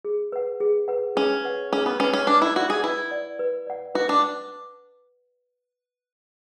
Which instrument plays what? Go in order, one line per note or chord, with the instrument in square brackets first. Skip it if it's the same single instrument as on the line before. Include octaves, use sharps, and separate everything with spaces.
[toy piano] G#4
B4 F#5
G#4
B4 F#5
[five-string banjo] C#4 [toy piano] G#4
[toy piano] B4 F#5
[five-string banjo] C#4 [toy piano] G#4
[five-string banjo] B3
[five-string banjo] C#4 [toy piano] B4 F#5
[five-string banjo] C#4
[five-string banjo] D4 [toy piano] B4
[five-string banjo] E4
[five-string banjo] F#4 [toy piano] D5 F#5
[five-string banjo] G#4
[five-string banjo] E4 [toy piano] B4
[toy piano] D5 F#5
B4
D5 F#5
[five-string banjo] F#4 [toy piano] B4
[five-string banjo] D4